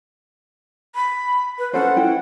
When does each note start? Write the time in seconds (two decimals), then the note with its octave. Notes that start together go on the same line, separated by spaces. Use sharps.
0.95 B5
1.59 B4
1.73 C#4 A4 C5 F#5
1.96 E4 G5